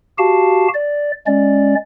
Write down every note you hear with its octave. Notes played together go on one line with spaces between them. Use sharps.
F#4 G4 F5 A5
D5
G#3 C#4 D5